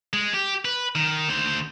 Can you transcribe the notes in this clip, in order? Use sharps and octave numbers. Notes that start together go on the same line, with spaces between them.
G#3
G4
B4
D#3
D2 C5